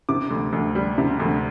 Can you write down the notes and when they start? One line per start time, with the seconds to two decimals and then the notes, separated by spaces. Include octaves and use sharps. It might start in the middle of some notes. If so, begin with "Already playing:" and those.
0.09 C3 D6
0.31 D2
0.53 D2
0.75 G3
0.98 C3
1.20 D2